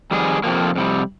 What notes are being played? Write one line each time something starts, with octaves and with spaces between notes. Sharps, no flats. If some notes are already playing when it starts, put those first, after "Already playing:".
F2 D#3 G3 G#4
F2 C3 F3 A#3
F2 C3 G3